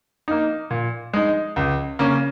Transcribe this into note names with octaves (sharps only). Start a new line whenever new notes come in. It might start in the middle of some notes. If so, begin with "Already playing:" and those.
A#3 D#4
A#2
G#3 D#4
C#2
C#3 A#3 C#4